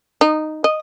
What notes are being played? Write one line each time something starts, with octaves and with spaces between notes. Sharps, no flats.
D#4
D#5